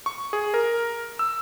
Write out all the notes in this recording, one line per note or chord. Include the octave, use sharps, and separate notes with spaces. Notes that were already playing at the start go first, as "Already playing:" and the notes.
C#6
G#4
A#4
E6